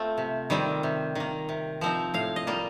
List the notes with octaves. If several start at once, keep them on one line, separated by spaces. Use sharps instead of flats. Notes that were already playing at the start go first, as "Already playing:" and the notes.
Already playing: A3 C4 F4
C3
D#3 G3 C4
C3
D#3 A#3
C3
F3 C4 D#4
A2 F5
D#5
G3 A#3 F4